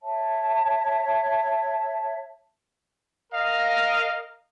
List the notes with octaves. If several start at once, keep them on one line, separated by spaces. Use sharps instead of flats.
C#5 E5 A5
A#4 D#5 F5